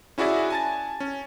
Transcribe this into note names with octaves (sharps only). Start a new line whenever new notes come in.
C#4 E4 F#4 G#4 D5 E5
G#5 A5 A6
C#4